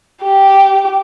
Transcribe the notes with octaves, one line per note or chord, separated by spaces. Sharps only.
G4